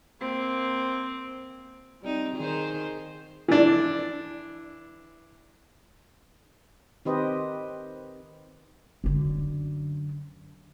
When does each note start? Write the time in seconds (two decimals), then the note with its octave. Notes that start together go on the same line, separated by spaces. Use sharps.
0.21 A#3 C4
2.02 G3 C4 D#4
2.36 D#3 G#4 C5
3.48 E3 D4
7.05 D#3 C4 G4 B4 C5 D#5
9.04 F#2 D3